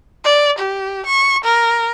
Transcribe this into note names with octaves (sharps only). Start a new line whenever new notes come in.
D5
G4
C#6
A#4